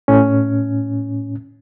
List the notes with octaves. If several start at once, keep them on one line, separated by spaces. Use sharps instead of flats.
A2 C#4